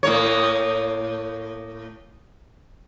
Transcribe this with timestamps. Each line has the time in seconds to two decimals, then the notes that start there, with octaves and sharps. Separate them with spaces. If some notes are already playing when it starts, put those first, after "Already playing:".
0.03 A2 A#3 C#5